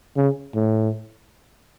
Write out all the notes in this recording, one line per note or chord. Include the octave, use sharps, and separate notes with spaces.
C#3
A2